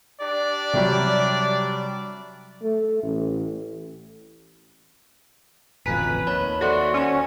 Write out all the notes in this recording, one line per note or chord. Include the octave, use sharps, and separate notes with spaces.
D4 G4 D5
C3 F#3 G3
A3
A1
D1 A1 F2 B4 G#5 A#5 B6
D#2 C#5 A5 B5
F#4 A4 C5 D5 E5 F#5 C6
C#4 A5 C#6 C#7